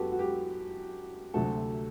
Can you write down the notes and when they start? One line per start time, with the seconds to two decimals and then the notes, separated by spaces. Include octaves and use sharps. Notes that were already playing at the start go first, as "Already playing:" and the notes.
Already playing: F#2 F#3 B3 F#4 G4 A4 B4
0.12 F#4
0.19 G4
1.34 D2 C3 F#3 A3 C4 F#4 A4